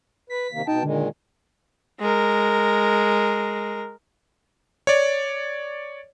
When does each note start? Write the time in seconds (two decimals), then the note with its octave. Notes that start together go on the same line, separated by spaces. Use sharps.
0.30 B4 B6
0.53 C3 D#3 A#3
0.67 B2 D#4 G5 A5
0.83 A#2 D3 D#3 G#3
2.00 G#3 A#4
4.87 C#5 D5